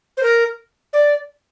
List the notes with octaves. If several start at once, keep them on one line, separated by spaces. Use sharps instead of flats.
C5
A#4
D5